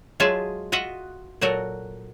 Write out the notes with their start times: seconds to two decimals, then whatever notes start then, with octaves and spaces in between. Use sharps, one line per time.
0.20 F#3 G#3 F4 G#4 E5 A5
0.72 F4 F#4 D#5 E5 F#5
1.41 A#2 F#3 F#4 A4 A#4